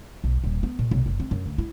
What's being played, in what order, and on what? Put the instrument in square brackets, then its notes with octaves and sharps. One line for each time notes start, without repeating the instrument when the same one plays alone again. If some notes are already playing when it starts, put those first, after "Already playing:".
[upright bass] B1
D#1
B3
A#2
B1
F#1
C4
F#2
D2
E4